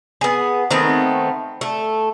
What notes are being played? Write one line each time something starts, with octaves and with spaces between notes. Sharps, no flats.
B3 G#4
D#3 A3 B3 C4
A3